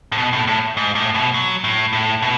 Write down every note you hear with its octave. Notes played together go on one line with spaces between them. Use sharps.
A2
B2
A2
A2
G#2
A2
B2
F#3
A2
A2
B2